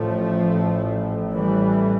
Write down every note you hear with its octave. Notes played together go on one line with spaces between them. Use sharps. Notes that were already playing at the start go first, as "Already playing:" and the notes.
Already playing: A1 A2 F3 A3
E3 G3